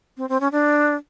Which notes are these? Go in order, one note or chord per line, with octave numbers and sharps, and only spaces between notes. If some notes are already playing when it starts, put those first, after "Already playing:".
C4
C4
C#4
D4